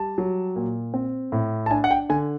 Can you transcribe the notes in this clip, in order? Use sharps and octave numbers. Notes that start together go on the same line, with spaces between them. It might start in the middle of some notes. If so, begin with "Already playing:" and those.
Already playing: G3 A5
F#3
A#2
C4
A2
A5
D4 G#5
F#5
G5
D3 G#5